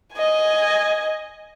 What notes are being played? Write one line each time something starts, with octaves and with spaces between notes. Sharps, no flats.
D#5 G#5